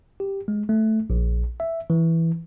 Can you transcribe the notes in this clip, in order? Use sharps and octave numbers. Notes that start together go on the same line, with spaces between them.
G4
G#3
A3
A#1
E5
E3